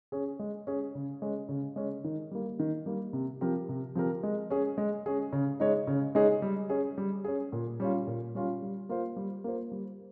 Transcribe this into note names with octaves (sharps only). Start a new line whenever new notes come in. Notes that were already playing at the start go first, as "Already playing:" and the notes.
C#4 G#4
G#3
C#4 G#4
C#3
G#3 C#4
C#3
G#3 C#4
D#3
G3 A#3
D#3
G3 A#3
C3
F3 C4 G4 A#4
C3
F3 C4 G4 A#4
G#3
C#4 G#4
G#3
C#4 G#4
C#3
G#3 D#4 G#4 C#5
C#3
G#3 D#4 G#4 C#5
G3
C#4 G#4
G3
C#4 G#4
A#2
G3 C#4 F4
A#2
G3 C#4 F4
G3
A#3 F4 C5
G3
A#3 F4 C5
G3